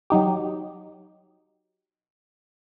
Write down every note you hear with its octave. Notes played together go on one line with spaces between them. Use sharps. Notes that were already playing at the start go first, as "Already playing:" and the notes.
F#3 D#4 G4